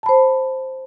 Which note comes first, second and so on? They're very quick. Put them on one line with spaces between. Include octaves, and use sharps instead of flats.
A5 B5 C5